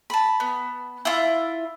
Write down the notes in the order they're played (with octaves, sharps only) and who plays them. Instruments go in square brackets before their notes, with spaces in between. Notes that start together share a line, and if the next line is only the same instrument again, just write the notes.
[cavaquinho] A5 B5
[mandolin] B3
E4 F4